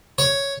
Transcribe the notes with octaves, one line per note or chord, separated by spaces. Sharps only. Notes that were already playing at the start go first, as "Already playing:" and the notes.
C#5